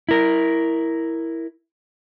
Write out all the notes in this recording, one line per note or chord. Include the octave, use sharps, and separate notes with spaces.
E4 A#4